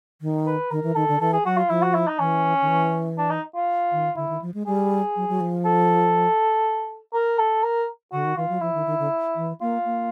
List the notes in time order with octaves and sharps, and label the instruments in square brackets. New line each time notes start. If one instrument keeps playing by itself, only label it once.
[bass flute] D#3
[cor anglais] B4
[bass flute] D#3 [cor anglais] A#4
[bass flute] E3
[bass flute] D#3 [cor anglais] A4
[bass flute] D3
[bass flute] E3 [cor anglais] A4
[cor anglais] G#4
[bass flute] F#3 [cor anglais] F#4
[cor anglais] F4
[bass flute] F3 [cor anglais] E4
[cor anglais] F#4
E4
D#4
[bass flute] E3 [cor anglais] C#4
[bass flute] D#3
E3
[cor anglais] D4
D#4
F4
[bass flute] D#3
[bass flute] D3 [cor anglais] E4
[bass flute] D#3
F3
G#3
[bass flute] G3 [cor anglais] G#4
[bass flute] F#3
F#3
F3
[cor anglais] A4
A#4
A4
A#4
[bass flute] D3 [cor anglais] F#4
[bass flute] D#3
[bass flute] E3 [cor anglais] F4
[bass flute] F#3
[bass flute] F3 [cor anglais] E4
[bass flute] D#3
D#3
D3
E3
[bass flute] A#3 [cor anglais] F4
[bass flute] A#3